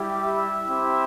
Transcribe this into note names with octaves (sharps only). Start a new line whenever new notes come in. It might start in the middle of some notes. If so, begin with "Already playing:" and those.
Already playing: G3 E4 G4
E5
C4 E4 G4